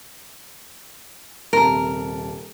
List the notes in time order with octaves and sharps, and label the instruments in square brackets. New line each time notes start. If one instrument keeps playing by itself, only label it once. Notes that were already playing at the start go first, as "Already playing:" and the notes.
[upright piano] D#1 C3 A5 [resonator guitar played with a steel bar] A#4